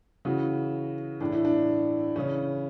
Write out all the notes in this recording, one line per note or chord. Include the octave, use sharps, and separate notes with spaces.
C#3 E3 F#4
A2 E3 D4
E4
D4
C#3 E3 C#4